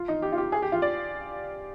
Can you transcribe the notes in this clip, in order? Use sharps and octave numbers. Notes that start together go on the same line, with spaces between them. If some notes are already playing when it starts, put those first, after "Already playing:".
Already playing: F4
D#4
G4
F4
G4
G#4
G4
F4
D5